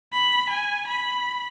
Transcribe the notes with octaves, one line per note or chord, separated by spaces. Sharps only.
B5
G#5
B5